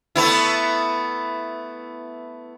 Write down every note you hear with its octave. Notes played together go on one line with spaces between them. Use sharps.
A3 B3 E4